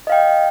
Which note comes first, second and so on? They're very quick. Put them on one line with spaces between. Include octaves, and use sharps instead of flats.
D#5 F5 G5